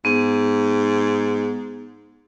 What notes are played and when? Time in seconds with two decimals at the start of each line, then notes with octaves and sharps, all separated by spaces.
0.05 G#2 B3